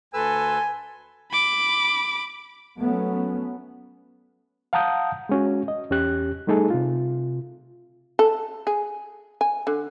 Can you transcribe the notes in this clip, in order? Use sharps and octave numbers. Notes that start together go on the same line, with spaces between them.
D2 A4 B4 G#5 C6 E6
B5 D6
F#3 A3 B3 C#4
F5 F#5 A5 A#5 D#6 G6
G#3 C#4 F#4
D#5
E2 C#4 G4 F#6
G3 A3 D#4 G#4 A4
C3 F4
A4
G#4
G#5
D3